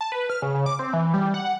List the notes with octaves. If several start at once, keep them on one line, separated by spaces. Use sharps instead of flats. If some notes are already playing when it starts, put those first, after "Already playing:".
A5
B4
F6
C#3
C#3
D6
C4
E3
G3
F#5